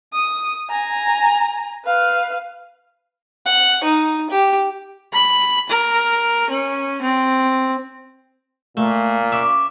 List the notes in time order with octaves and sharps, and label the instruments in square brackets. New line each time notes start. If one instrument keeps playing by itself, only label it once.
[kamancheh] D#6
G#5 A#5
B4 F5
[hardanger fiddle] F#5
D#4
G4
[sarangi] B5
A#4
C#4
C4
[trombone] A#2 [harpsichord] A3
[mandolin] C#4 D5 D6 [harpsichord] E5